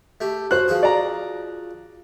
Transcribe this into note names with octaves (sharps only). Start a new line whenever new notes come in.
A3 G4
F#4 C5 F#6
F3 F#4 G#4
D5 A#5